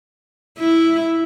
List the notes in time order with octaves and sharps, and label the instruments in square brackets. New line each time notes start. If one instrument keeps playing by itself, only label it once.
[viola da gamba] E4